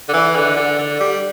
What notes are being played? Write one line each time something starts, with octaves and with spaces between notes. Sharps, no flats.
D3
E3
D3
D3
D3
G3